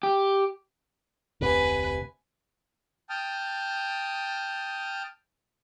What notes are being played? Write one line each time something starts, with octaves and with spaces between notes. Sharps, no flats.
G4
F1 D2 C3 B4 G#5
G5 A5 D#6 F6